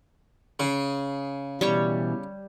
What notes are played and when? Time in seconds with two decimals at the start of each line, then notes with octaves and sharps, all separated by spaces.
0.59 C#3 G#4
1.61 B2 E3 G3 C#5 C#6